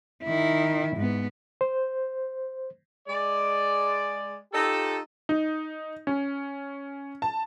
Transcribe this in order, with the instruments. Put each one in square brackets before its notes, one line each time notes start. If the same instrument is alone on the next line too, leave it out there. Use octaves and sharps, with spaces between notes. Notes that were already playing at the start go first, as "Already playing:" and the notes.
[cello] D#3 E4
G#2 B3
[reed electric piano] C5
[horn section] G#3 D5
D#4 F4 G4 A4
[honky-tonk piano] D#4
C#4
A5